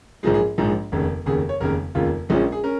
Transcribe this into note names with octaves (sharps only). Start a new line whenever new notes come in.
A#1 G#2 F3 G#3 G#4
G#4
A#1 G#2 F3 G#3
F1 D#2 C#3
F1 D#2 C#3 G#4
C#5
F1 D#2 C#3 A#4
F1 D#2 C#3 F4
A#1 A#2 F3 G#3 C#4 G#4
G#4
C#4 A#4